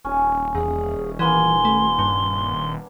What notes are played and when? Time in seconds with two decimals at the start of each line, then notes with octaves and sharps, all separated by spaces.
0.05 D#1 C#4
0.55 E2 G#4
1.19 E3 A#3 B3 G#5 C6
1.65 A3
1.99 G2 D4